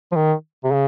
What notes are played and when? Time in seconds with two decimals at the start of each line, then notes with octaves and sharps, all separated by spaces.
0.12 F3
0.16 D#3
0.64 C3
0.72 C#3